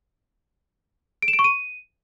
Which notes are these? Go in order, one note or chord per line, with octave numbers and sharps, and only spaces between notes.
D7
E7
D7
C#6
D#7